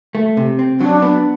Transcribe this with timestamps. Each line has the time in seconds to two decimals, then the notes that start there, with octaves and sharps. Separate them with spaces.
0.15 A3
0.37 C3
0.59 C4
0.80 F#3 D4
1.02 B3